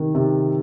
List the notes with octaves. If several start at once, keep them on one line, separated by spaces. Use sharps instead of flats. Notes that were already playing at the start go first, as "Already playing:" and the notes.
Already playing: C3 D#3
C3